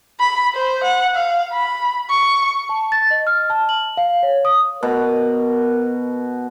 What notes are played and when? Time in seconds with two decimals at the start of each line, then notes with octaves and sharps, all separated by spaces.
0.20 B5
0.55 C5
0.83 F#5
1.15 F5
1.53 B5
2.10 C#6
2.69 A5
2.92 A6
3.11 D#5
3.27 F6
3.50 A5
3.69 F#7
3.97 F5
4.23 C#5
4.45 D#6
4.83 B2 A#4